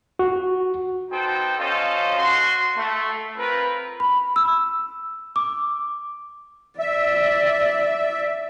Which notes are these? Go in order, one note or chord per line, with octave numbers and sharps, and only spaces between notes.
F#4
B3 D#4 A4 C5 G5
C#4 F#4 A4 C5 D#5 F5
F#4 C6
A3
C4 F4 A#4 B4
B5
E6
D6
D5 E5